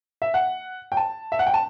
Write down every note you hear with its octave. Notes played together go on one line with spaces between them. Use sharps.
E5
F#5
G5
A5
E5
F#5
G5
A5